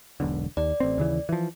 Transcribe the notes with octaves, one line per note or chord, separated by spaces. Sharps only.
E1 B1 D3
D#2 D5
A1 C4
D#2 C#3 E3
E3 F3